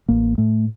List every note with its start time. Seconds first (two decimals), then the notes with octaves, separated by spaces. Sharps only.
0.09 A1 A#3
0.38 A2 A3